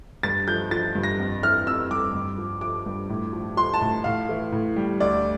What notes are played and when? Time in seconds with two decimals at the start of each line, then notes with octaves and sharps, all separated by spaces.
0.23 G2 A6
0.48 F3 G6
0.71 F3 A6
0.95 G2
1.03 A#6
1.19 F2
1.43 E3 F6
1.67 F2 E6
1.90 G3 D6
2.14 G2
2.38 F3
2.61 F3 D6
2.86 G2
3.09 A2
3.33 F3
3.57 F3 C6
3.74 A5
3.81 A2
4.04 A2 F5
4.29 E3
4.52 A2
4.76 G3
5.00 D2 D5